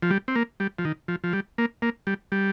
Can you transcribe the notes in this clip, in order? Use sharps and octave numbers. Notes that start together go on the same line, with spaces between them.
F3
G3
C4
A#3
G3
F3
D#3
F3
F3
G3
A#3
A#3
G3
G3